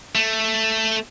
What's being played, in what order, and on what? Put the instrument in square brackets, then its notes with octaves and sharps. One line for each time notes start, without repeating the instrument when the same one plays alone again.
[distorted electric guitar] A3